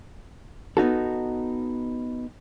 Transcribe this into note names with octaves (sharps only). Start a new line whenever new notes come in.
B3 D#4 F#4 A4